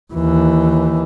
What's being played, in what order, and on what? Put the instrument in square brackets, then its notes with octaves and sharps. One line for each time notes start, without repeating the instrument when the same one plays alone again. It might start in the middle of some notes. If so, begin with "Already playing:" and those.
[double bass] D#2 E3